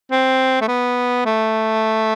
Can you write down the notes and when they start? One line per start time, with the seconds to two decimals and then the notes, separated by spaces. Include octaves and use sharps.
0.11 C4
0.61 A3
0.68 B3
1.25 A3